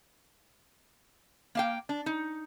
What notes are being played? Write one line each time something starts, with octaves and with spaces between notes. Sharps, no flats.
A#3 F5 G5
D4
D#4